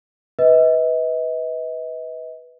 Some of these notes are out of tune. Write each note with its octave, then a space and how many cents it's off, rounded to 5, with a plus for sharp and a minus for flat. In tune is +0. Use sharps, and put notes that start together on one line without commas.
B4 +0 D#5 +40